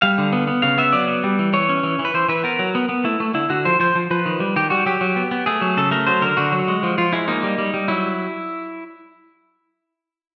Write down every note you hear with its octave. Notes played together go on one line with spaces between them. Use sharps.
G3 F5
D3
B3
B3
C#3 F5
B3 E5
F#3 D5
B3
G3
E3
E3 C#5
C#4
E3
E3
B4
E3 C5
E3 B4
B3 A#4
F#3
B3
B3
A3 E4
A3
D3 E4
D3 F#4
F3 C5
F3 C5
F3
F3 B4
D#3
G3
D#3 G4
G3 F#4
F#3 G4
F#3
B3
B3
A3 G#4
F#3
C#3 A4
A3 A#4
F#3 C5
D3 A#4
D3 F#4
F#3
G#3
F3
F3 F4
G#3 E4
A#3 D#4
G3
G3
G3
F#3 E4